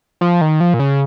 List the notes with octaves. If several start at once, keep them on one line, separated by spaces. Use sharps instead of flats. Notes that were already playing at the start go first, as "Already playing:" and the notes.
F3
D#3
F3
A#2
C#3